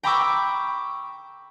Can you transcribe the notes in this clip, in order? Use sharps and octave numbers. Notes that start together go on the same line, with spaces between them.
G5 A#5 B5 C#6 D6 E6